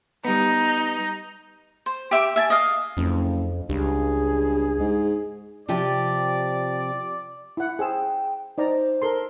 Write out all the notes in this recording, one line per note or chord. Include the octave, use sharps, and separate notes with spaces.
G3 B3 D#4
C5
G4 E5 G5 D6
E5 G#5 A5
D#5 F5
F#1 F2
C#2 G2 G#4
G#2
C3 F3 G4 D5
E4 F#5
G#4 C5 G5 E6
D#4 C5 D5 A#5
A4 A#4 C6